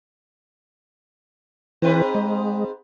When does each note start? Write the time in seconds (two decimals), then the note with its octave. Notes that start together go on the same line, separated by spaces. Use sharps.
1.82 G#2 E3 C4 B4
2.15 G#3